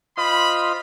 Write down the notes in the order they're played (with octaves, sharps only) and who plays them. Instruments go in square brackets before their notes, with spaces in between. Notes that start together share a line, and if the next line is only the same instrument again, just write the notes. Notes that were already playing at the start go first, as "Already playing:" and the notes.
[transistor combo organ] F4 C5 D#5 [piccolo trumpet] B5